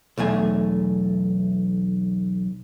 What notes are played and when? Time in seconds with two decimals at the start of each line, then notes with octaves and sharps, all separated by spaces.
0.18 B1 E2 A3 G#5